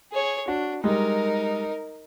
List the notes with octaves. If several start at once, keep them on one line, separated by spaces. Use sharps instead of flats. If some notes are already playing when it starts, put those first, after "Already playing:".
G#4 C#5
D4 F#4
G3 G#3 D#4 A#4